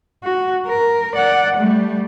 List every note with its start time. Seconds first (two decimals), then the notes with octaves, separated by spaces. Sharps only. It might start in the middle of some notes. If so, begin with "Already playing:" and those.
0.24 F#4
0.66 A#4
1.15 D5 F#5
1.57 G3 A3